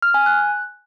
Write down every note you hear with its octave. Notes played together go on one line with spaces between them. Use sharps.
F6
G#5
F#6